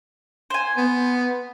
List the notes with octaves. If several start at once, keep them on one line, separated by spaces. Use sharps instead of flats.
C5 G#5
B3